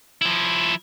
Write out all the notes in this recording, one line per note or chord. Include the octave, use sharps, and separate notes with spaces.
F3 E4